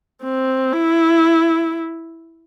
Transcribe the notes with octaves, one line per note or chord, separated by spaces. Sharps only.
C4
E4